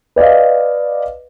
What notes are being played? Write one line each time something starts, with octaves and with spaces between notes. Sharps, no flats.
B4 D5 D#5 F5